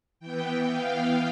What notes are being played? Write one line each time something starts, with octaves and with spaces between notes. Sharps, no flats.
E3 B3 G5
F5